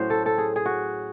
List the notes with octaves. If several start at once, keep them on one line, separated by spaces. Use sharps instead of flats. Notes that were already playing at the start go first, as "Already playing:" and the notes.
Already playing: A2 F#3 C#4 C5
A4
A4
G#4
G#4
F#4